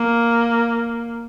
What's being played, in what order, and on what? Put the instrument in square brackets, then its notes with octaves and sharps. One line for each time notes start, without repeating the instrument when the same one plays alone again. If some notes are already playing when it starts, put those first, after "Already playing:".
Already playing: [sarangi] A#3